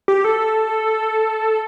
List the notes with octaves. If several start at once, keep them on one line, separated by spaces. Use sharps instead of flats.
G4
A4